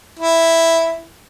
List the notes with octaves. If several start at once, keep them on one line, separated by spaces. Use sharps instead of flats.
E4